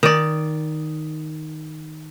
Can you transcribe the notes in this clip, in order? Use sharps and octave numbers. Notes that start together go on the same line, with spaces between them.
D#3 D5